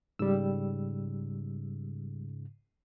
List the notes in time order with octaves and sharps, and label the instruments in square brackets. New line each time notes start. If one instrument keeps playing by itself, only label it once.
[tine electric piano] G#2 C#3 [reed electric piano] G3 E6